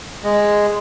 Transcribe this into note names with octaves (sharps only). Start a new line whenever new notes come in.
G#3